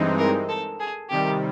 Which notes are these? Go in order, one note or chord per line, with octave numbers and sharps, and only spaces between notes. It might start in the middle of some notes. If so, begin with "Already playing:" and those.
Already playing: G2 E3 G#3 C4 D#4
A#4
A4
G#4
C3 D#3 G3 G4